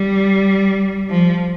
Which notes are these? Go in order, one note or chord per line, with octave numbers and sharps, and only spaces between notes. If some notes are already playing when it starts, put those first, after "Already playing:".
Already playing: G3
F3